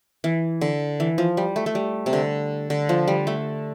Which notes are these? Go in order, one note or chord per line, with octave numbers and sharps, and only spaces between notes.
E3
D3
E3
F3
G3
A3
A3
G3
C3
D3
D3
F3
G3
A3